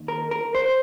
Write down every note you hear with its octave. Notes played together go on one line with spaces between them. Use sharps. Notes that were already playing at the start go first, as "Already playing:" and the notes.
Already playing: D#2 D#3
A#4
A#4
C5